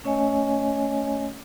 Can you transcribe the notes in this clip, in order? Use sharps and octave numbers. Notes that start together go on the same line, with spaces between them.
A3 C#4 C#5 D#5 G#5